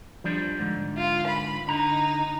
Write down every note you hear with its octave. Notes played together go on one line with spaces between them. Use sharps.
F3 G3 D4
G#2 D3
F4
B5
D3 D#4 A#5